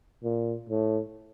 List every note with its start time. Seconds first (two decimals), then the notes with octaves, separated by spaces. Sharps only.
0.24 A#2
0.69 A2